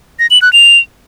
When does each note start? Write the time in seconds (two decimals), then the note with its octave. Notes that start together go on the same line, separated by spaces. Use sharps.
0.19 A#6
0.31 F#7
0.42 F#6
0.53 F7